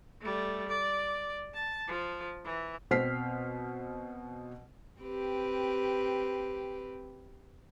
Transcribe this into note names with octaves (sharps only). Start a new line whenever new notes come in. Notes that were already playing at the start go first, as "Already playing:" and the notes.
G3 A3
D5
A5
F3
E3
B2 C4 C5 F6 B6 C7
C4 G4 B4